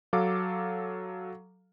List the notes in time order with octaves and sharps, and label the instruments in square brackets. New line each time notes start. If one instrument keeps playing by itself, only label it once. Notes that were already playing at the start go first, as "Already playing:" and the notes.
[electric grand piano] F#3 A4 F5 D6